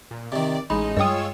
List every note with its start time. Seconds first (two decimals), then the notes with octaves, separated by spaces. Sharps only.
0.11 A#2
0.32 C3 D#3 D5
0.70 A1 G#3 D#4 B5
0.97 G2 F4 C#5 D#5 G5 D#6 E6